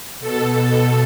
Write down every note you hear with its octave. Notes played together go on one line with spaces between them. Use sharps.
B2 A4